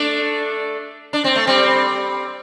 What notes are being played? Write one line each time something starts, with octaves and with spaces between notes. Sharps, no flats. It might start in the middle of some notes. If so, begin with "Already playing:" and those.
Already playing: A3 D4
D4
C4
A3
G3 C4